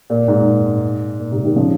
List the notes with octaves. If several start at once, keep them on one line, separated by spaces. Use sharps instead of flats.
A#2
G#2
A#2
G#2 C3
C3 D#3
C#3 F3